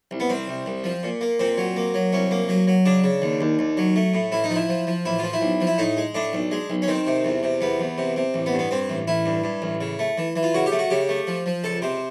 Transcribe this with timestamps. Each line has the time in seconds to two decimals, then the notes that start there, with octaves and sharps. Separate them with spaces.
0.11 C2
0.20 B3
0.29 C2 C4
0.48 C2
0.66 C2
0.84 F3
1.03 A#2
1.21 A#3
1.39 A#2 C4
1.58 F#3
1.76 A#3
1.94 F#3
2.13 C2 C#4
2.31 A#3
2.49 F#3
2.67 F#3
2.86 C#3 D4
3.04 C#3
3.22 D#2
3.41 D#2
3.59 D#2
3.77 F#3
3.96 A3
4.14 A2
4.32 A1 E4
4.44 D#4
4.50 F3
4.56 E4
4.69 F3
4.87 F3
5.05 A1 E4
5.19 F3 F4
5.33 E4
5.41 B1
5.61 F3
5.67 E4
5.78 A2 D#4
5.97 G#3
6.15 A2 D4
6.33 B1
6.51 G#3
6.70 B1
6.82 C#4
6.88 D#3 C4
7.07 C3
7.25 E2
7.43 C3
7.61 E2 B3
7.80 E2
7.98 C3
8.17 C3
8.34 A1
8.46 B3
8.53 G2
8.59 B3
8.71 G2 C4
8.90 A1
9.08 A1 E4
9.26 G2
9.44 G2
9.62 A1
9.81 C#3
9.99 A3
10.18 E3
10.36 E3
10.43 F4
10.54 C#3 F#4
10.66 G4
10.72 A3
10.79 F#4
10.90 C#3 G4
11.09 A3
11.27 F3
11.46 F3
11.64 C#2 A4
11.82 C3 C5